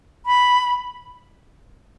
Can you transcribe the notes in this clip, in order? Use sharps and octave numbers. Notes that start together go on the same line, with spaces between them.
B5